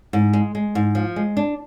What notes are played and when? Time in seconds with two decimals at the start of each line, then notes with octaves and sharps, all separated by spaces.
0.13 G#2
0.33 G#3
0.55 G#3
0.75 G#2
0.95 F3
1.16 G#3
1.37 D4